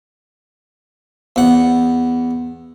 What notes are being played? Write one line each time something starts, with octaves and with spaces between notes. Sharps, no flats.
E2 F#5